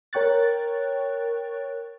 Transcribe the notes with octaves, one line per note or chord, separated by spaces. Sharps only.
A#4 C#5 G5 C#6 F#6 A6